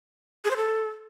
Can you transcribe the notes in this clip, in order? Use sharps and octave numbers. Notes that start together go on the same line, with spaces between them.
G#4
C5
A4